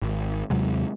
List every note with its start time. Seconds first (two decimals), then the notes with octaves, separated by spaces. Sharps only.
0.02 G#1
0.50 D#2 C3 F#3 G#3